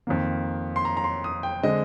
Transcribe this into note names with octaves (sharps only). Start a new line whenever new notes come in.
F2 D#3 A#3
C6
A#5
A#5
C6
D#6
G5
D3 G#3 C4 D#5